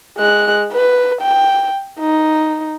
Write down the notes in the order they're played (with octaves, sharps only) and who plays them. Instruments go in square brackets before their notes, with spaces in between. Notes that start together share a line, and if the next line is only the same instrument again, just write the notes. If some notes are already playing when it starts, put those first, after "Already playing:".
[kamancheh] G#3 F#6
B4
G5
D#4